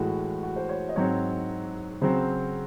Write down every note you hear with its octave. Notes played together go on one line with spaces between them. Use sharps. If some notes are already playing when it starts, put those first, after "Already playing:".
Already playing: A2 E3 G#3 F#4
F#4
C5
C#5
D#5
G#2 F#3 C4 C#5
C#3 F#3 C4 C5